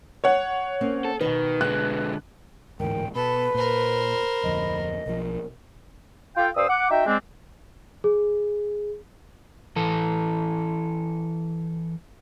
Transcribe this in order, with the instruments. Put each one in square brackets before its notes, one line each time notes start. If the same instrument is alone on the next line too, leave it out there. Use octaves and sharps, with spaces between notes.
[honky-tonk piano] C#5 F#5
[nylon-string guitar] A#3 C4 C#4
[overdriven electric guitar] A4
[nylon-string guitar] B2 B4 [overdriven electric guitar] D#3
[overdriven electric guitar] D3 G#3 [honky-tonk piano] F#6
[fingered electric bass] D1 G#2 E3 [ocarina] A#4 [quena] G5
[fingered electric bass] B2 [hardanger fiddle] A4 [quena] B4 [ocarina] B5
[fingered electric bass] A#2 [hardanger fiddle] A#4 C5
[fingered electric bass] D1 F2 D3 [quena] D#5
[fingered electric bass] B1 F3 [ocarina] A#4
[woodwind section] F4 A4 F5 G5
G2 C5 D5 D#6 E6
F#5 D6
D#4 F#4 E5 G5
G#3 C4 D4
[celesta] G#4
[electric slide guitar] E3 A4